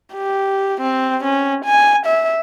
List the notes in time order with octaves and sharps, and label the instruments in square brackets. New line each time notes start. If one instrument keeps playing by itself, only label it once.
[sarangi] G4
C4
C#4
G#5
E5